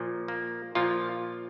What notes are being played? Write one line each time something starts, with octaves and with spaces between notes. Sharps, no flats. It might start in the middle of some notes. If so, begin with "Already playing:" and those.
Already playing: A#2 F3
A#3
A#2 F3 F4